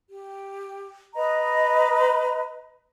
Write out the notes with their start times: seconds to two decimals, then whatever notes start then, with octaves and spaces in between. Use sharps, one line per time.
0.09 G4
1.15 B4 D#5 A#5 B5